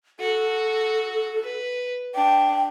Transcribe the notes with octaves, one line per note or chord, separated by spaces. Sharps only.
F#4 A4
B4
D4 G5